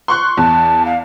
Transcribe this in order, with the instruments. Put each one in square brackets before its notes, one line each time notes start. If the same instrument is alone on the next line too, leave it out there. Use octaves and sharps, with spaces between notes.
[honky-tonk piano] C6 C#6 F#6
[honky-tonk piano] E2 [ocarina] A5
[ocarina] F5